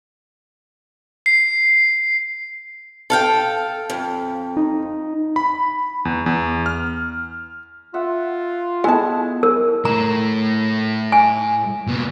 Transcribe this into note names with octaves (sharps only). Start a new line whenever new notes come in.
C7
A4 F5 G5
F2
D#4
B5
E2
E2
F6
F4 E5 F#5
G#3 B3 E4 A4 G#5 A5
A#4
A2 A#5
G#5
A#2 B3